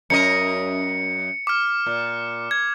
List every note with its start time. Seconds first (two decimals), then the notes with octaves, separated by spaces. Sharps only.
0.10 F#2 A#4 D#5 C#7
1.47 D6 F6
1.86 A#2
2.51 G#6